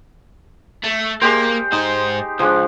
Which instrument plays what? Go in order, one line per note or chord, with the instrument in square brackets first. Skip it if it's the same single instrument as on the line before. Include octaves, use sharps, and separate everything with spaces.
[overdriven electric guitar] A3
[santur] G#3 G4 C5 [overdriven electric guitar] A#3
[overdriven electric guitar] G#2 C5 [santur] D#4
[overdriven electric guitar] C#2 [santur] F3 G#3 D4